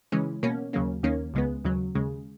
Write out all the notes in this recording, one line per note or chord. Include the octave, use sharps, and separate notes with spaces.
C#3 E3 G#3 C#4
B2 A#3 C#4
D#2 C#3 F#3 A#3 C#4
D#2 D#3 A#3 C#4
C#2 C#3 G#3 B3
D#2 C#3 F#3
D#2 C#3 G#3